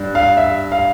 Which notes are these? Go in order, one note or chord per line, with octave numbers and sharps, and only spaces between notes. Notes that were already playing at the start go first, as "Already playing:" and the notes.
Already playing: G2
F5
E5
F5